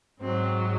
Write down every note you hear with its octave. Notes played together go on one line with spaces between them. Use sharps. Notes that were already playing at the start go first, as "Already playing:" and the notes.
G#2 F#3 C4